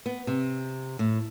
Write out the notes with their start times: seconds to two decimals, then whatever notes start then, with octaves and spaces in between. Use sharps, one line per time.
0.06 B3
0.27 C3
0.99 A2